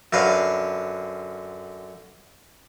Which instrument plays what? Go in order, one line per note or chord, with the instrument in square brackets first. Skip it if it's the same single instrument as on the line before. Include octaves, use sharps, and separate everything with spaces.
[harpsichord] F#2 D3 B4 F5